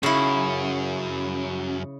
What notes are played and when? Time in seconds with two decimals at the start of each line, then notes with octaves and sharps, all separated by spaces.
0.03 F#2 C#3 E4